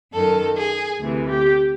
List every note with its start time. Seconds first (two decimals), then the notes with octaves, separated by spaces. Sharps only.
0.13 F#2 D#3 A4
0.57 G#4
1.00 D2 C3 E3
1.29 G4